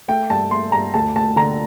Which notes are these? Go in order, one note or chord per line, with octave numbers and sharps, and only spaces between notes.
A3 G5
G2 A5
A3 C6
G2 A#5
D2 A5
D2 A5
D3 A#5